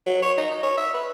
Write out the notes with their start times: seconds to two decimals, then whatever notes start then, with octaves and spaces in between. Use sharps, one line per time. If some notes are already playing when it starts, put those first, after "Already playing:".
0.06 F#3
0.22 C#5
0.38 D#4
0.51 D#4
0.63 C#5
0.77 E5
0.94 B4